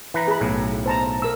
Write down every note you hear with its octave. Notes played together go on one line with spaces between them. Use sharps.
E3 B4 A#5
G#4 B5
B1 A2
C5 A5 A#5
A#4 E6